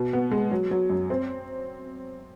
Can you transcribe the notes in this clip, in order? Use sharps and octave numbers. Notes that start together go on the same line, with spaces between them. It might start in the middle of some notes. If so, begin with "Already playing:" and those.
Already playing: B2
B3
G#3
F#3
F#3
F#2
C4